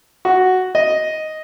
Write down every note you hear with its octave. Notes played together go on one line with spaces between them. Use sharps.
F#4
D#5